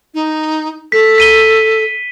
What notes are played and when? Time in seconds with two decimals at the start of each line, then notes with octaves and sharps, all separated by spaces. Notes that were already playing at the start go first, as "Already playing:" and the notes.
0.14 D#4
0.92 A4 B6
1.18 B6 D#7 G7